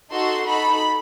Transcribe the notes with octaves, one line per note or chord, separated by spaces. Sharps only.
D#4 F#4 A4 C6
D#4 F#4 A4 B5